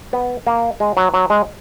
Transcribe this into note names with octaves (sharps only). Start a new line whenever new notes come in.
B3
A#3
G#3
F#3
F#3
G#3